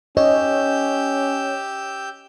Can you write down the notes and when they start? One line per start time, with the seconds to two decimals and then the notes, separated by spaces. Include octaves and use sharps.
0.17 C#4 G4 C#5 D#5 E6 G6